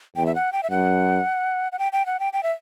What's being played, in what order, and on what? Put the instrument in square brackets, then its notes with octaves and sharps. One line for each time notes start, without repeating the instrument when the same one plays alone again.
[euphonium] E2 [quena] G5
[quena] E5
F#5
G5
E5
[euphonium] F#2 [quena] F#5
[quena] F#5
G5
G5
F#5
G5
G5
E5